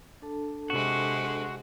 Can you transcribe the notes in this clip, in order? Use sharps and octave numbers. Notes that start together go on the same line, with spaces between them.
D4 A4 A5
C3 G#3 F#4